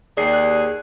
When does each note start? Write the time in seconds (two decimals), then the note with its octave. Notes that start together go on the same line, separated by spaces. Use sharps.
0.17 D#2 G#4 D5 C7
0.33 F#6